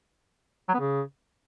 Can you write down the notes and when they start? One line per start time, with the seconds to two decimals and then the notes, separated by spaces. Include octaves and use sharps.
0.69 F#3
0.74 B3
0.79 C#3